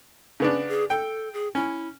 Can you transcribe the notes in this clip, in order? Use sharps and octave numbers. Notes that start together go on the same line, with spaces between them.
C#3 B3 C#4 D4
G#4
A4 G5
G#4
C#4 E4